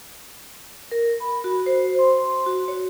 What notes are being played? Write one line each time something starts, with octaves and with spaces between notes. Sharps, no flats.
A#4
B5
F#4
C5
C6
F#4
C#5